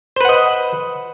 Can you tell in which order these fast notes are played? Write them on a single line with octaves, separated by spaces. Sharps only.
C5 B4 F#5 D#5